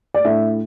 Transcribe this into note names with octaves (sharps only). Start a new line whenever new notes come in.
D5
A2 A3 D4 E5